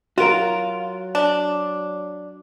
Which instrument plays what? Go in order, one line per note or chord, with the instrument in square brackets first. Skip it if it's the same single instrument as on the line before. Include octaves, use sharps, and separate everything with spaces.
[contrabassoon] F#3 [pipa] F4 [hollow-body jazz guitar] F#4 A#4
[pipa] D4